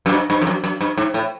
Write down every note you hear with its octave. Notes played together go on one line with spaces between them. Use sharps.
F#2
G2
G2
F2
F#2
F#2
G2
G#2
A2